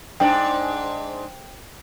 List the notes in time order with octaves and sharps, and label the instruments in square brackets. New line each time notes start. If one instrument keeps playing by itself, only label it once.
[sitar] G#2 D4 [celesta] C5 G5